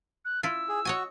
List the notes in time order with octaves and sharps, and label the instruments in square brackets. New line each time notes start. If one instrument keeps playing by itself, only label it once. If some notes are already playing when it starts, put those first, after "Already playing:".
[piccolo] F#6
[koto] E4 F4 [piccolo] E6
[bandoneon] G#4
[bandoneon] F#4 [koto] C#5 D#5 G#5